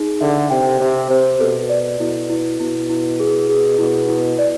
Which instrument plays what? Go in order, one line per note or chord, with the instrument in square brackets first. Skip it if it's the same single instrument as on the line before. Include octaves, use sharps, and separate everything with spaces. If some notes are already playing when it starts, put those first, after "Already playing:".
Already playing: [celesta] D#4 G#4
[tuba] D3 [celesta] E5
[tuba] C3 [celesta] G5
[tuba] C3 [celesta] C5
[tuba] C3 [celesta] C5
[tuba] B2 [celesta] A4
[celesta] D5
[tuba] B2 [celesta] E4
[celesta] E4
[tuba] B2 [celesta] E4
[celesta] E4
G#4
G#4
[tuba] B2 [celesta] E4
[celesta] E4
D5